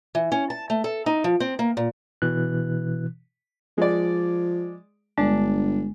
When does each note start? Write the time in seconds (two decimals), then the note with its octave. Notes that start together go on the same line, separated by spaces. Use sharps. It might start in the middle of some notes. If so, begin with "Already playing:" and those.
0.15 E3
0.32 C#4
0.50 A5
0.70 A3
0.84 A4
1.06 D#4
1.24 F3
1.40 C4
1.59 A#3
1.77 A#2
2.22 B2 E3 F#6
3.78 F3 G#3 D5
5.18 G1 G#3 D4